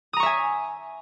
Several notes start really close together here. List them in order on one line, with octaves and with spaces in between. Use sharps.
D#6 A#5 C#6 E5 G#5